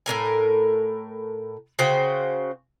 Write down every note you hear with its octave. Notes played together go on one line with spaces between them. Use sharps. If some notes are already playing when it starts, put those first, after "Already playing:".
A2 C3 A#4 G#5
C#3 F#4 C5 G5